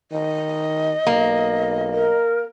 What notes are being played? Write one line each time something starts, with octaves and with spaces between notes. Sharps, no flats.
D#3 D#5
B1 A#3
A#4